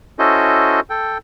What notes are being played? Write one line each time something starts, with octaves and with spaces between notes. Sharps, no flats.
C#4 E4 F#4 A4 C5 D#5
A4 G5